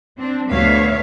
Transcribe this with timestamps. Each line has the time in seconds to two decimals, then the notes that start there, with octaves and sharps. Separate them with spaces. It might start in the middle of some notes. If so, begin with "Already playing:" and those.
0.18 C4 D4
0.50 D2 B3 C#5 E5 F5